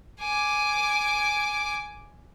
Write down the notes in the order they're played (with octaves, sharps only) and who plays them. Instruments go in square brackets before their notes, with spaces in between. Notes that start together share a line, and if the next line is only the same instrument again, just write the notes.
[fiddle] G#5 D6